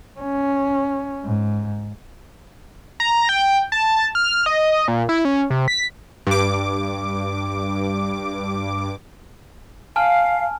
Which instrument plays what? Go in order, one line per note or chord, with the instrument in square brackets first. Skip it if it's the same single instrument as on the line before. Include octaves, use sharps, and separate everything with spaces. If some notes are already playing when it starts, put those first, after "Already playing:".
[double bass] C#4
G#2
[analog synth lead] A#5
G5
A5
F6
D#5
A#2
E4
C#4
C3
B6
[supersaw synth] G2 D6
[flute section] F5 [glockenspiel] G#5 A5 F6